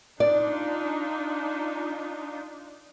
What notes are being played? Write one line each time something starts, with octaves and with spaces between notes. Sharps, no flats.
D4 D#4 F4 D5